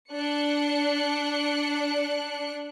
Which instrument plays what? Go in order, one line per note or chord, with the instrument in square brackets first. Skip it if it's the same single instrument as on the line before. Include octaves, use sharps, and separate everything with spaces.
[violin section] D4 F#6 C#7